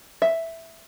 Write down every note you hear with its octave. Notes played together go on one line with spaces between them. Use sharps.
E5